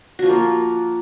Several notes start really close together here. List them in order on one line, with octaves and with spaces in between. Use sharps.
F#4 F3 F4 A#3